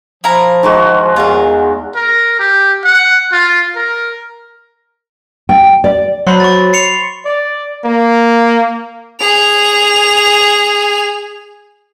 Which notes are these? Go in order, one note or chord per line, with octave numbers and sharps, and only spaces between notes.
F3 E4 F5 A#5
D#3 G#3 F#4
E2 F4 A#4
A#4
G4
F#5
F4
A#4
G5
D5
F#3 C5 B5 C6
C#6 A6
C7 C#7 F7
D5
A#3
G#4 F7